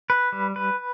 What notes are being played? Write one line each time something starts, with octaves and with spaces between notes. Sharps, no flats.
B4
G3
B4